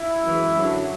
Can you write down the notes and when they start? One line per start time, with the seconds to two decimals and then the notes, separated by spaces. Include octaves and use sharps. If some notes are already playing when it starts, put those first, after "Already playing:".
Already playing: E4
0.24 F#2 E3 G#3
0.56 F#2 D3 F#3